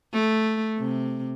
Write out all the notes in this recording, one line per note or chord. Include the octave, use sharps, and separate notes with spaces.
A3
C3